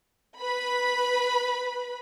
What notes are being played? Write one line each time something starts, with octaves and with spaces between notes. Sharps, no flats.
B4 B5